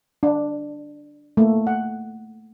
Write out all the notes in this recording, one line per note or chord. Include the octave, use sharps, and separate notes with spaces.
D4
A3 A#3
F#5